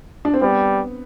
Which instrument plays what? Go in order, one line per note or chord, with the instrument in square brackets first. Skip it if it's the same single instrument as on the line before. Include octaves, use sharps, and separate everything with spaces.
[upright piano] D4
C4
[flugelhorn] G3 [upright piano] B3